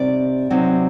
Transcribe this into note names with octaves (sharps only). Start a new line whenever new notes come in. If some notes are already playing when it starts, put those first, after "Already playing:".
Already playing: C3 G3 C4 D#4 D5
C3 F#3 C4 D#4